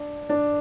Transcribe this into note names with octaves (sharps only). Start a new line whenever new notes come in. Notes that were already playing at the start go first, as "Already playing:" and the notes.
Already playing: D4
D4